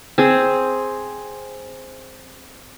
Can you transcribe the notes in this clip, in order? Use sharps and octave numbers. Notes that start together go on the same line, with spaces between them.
C4 G#4